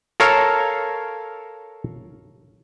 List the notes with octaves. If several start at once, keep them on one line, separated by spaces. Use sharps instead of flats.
A4 A#4 C#5 F5